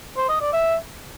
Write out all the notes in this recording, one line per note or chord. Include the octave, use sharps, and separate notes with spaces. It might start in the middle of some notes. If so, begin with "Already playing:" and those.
C5
D#5
D5
E5